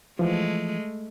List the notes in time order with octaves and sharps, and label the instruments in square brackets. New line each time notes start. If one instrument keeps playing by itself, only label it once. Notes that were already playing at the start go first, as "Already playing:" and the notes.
[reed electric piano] E3 F3 [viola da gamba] G#3 A3